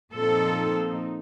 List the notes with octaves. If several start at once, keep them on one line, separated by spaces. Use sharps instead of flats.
A#2 F3 C4 D#4 A4